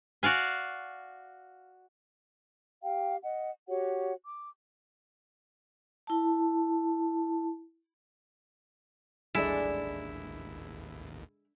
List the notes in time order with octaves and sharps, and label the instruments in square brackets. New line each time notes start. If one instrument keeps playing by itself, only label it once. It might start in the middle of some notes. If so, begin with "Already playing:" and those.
[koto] F#4 D5 F5 G#5
[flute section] G4 F5 G5
D#5 F#5
F#4 G4 C#5 F#5
D6
[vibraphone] E4 A5
[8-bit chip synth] A1 D#2 [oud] G#3 [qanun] D4 A4 [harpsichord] E4